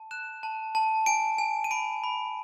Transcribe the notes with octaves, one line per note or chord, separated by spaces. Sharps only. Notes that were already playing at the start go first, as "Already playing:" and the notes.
Already playing: A5
F#6 E7
A5
A5
G#5 D7
G#5
D#7
B5 D7
B5